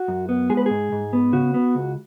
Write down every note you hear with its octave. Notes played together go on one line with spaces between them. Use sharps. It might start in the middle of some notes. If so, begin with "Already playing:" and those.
Already playing: F#4
F#2
B3
G#3 G#4
B4
G#2 G#4
G#2
B3
C#3 F#4
B3
C#2